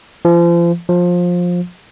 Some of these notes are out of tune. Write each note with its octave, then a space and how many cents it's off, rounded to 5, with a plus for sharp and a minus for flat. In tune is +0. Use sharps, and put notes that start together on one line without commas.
F3 -35
F3 +20